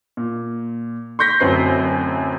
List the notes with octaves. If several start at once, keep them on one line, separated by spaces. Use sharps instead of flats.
A#2
C6 C#6 G6 A#6 B6
D1 F#2 F#3 C4 B4 C7